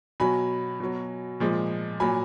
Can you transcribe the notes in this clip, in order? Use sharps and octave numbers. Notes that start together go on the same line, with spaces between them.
B2 F#3 G#5 B5
B2 F#3
A#2 F3 G#3
A#2 F#3 G#5 B5